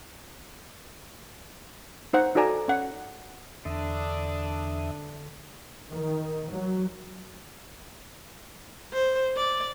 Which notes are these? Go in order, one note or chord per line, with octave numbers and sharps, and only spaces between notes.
D#4 C5 F#5
D#4 F#4 A4 D5 G#5 A#5
C#4 F#5
E2 D3 D4 E5 D#6
D#3
F#3
C5
D5